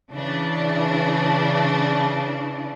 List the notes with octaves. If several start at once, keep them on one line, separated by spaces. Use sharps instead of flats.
C#3 E3 D4